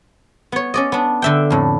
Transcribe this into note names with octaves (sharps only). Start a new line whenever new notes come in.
B3 C#5
C#4 D5 D#5
B3 D4
D3 E5 G5
F2 A2